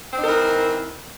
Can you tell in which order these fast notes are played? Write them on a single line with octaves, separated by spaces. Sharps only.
C4 D#4 A#4 E3